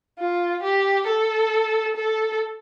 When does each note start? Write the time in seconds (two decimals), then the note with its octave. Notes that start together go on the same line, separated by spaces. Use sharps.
0.19 F4
0.63 G4
1.07 A4
1.96 A4